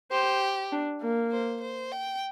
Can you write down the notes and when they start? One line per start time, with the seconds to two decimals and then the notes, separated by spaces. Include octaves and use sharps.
0.11 G4 C5
0.72 D4
1.02 A#3
1.31 C5
1.61 C5
1.92 G5